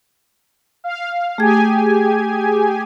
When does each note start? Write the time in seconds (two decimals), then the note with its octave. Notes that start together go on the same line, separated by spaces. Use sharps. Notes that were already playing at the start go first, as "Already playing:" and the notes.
0.84 F5
1.38 A3 G4 G#4 G#5 G#6